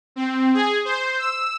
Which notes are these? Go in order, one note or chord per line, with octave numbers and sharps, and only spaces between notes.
C4
G#4
C5
E6